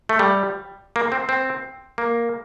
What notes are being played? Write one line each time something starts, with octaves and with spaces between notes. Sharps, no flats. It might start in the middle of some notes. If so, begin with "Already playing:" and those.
A3
G3
A#3
C4
C4
A#3